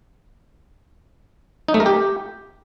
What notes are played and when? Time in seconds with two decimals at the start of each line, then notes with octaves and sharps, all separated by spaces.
1.68 D#4
1.74 A3
1.80 A#4
1.86 G4